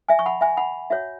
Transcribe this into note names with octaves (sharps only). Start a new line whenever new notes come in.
E5 G#5
C#6
F#5 B5
E5 G#5
F#5 B5
F#4 C#5 E5